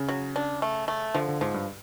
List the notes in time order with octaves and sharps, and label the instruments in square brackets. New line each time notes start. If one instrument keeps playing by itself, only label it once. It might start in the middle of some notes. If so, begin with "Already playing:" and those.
Already playing: [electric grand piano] C#3
[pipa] F#3
D4
A3
A3
[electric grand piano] D3 [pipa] F3
[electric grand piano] D3
[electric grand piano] G#2 [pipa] F3
[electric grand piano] G2